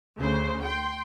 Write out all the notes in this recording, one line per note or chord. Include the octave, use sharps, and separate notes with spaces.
D2 C#3 C5
G5 C6